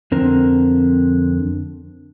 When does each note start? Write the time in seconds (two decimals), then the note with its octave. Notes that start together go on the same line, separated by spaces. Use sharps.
0.11 F2 D3 C4 A#4